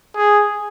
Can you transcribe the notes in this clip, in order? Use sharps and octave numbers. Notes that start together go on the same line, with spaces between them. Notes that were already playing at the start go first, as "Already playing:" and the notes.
G#4